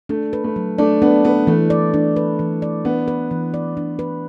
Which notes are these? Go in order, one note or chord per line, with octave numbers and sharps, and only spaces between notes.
A3 D4
B4
A3
F#3
A3 D4 D5
B3 D4
B3 B4
E3 A3
D5
D4
B4
E3
D5
B3 D4
B4
E3
D5
D4
B4